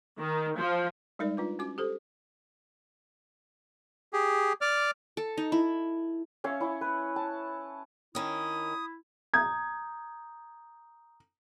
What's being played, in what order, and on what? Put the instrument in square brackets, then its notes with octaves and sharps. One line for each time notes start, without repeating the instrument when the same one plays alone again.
[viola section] D#3
F3
[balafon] G3 G#3 D#4 A#4 D5
D4 F4 B4
C#4 F#4 D6
G4 A4 C5
[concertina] G4 G#4
D5 D6 F6
[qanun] A4
D#4
E4
[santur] C#4 C#5 E5 F5
C#4 E4
B4
A5
[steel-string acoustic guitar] D#3 C#4 [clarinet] E4 [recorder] D#6
[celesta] A#5 D#6 G6 [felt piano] G#6